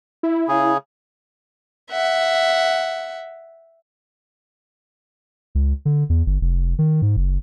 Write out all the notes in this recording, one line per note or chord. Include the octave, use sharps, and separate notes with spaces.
E4
C#3 G#4
E5 F#5
C#2
D3
E2
G1
F1
D#3
G#2
F#1